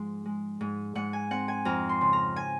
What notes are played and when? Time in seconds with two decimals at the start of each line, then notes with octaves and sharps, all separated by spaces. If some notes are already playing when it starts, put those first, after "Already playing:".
Already playing: G#2 F3 G#3
0.25 G#3
0.61 G#2
0.95 G#2 F#5
1.13 G#5
1.31 C4 F#5
1.48 G#5
1.65 F2 A#5
1.89 C6
2.01 C#3
2.13 A#5
2.36 G#5